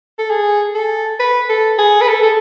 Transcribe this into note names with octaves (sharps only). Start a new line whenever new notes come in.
A4
G#4
A4
B4
A4
G#4
B4
A4
A4